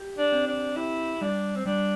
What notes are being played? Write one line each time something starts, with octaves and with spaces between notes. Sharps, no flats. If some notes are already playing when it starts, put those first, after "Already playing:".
Already playing: G4
D4
C4
D4
E4 G4
G3 D4
C4
G3 D4